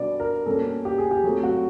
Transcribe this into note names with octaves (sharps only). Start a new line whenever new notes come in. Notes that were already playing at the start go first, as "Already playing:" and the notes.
Already playing: B2 G3 B3 D4 D5
A#4
B2 G3 A#3 C#4 A4
G4
G#4
G4
F#3 A3 C4
F#4